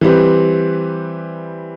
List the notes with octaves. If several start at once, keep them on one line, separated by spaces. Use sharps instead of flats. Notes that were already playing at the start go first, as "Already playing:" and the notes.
E3 G3 C4 G4 B4